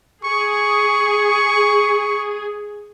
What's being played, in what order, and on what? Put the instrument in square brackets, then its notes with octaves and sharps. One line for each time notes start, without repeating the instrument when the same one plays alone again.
[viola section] G#4 [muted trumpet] C#6